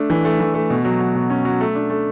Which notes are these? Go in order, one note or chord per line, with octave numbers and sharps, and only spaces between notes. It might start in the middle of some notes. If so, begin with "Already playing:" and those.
Already playing: A3 D4
E3
A3
E3
A3
B2
F#3
F#3
B2
C#4
F#3
A3
D4
A3